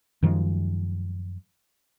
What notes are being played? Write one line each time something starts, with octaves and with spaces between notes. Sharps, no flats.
F#2 D#3 F3 G#3